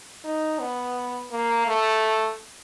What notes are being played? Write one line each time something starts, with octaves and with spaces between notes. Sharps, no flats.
D#4
B3
A#3
A3